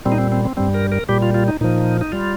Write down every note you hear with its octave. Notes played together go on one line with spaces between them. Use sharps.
A#2 G3 C4
D#4
C4
C4
C4
G2 G3 C4
A#4
A#4
A#2 G3 G4
F4
F4
D#4
A#2 F3 D#4
D#4
G3 F4